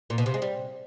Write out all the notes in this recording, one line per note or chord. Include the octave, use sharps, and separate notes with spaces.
A#2
B2
C3
G#3
G3